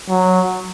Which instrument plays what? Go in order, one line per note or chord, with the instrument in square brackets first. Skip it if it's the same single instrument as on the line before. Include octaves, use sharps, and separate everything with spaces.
[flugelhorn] F#3